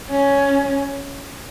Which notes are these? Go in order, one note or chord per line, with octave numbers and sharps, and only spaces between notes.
C#4